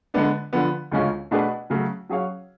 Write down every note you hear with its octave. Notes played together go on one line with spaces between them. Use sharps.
D3 G#3 B3 D4
D3 F3 B3
D2 C#3 G#3 C#4 F4
B2 A3 D4 G#4 B4
C#3 F#3 A3
F#3 C#4 G#4 C#5 F5